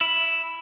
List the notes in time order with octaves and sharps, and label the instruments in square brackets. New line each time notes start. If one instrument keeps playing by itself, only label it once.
[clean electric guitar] E4